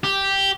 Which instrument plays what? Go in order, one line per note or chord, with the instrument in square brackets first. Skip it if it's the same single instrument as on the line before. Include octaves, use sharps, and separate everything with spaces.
[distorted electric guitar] G4